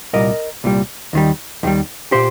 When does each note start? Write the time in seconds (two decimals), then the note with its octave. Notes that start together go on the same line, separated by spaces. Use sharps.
0.13 C2 A#2 G3 A#4 D#5
0.64 C2 A#2 G3
1.13 D#2 D#3 G3
1.63 D#2 D#3 G3
2.12 A#2 G4 C5